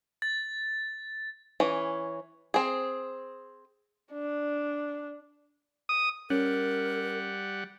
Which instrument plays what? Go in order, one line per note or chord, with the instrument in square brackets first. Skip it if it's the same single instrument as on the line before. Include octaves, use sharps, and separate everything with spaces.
[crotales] A6
[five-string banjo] E3 C#4
C4 G#4
[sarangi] D4
[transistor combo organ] D#6
[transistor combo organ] G3 F#5 [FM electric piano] C#4 [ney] A#4